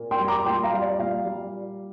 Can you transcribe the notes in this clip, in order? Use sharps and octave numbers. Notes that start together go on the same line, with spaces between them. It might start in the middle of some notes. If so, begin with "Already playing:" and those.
Already playing: A#2 A#3
G5 C6
G3
A#5 D6
A#2 G5 C6
F5 A#5
G3
D5
A#2 F5
G3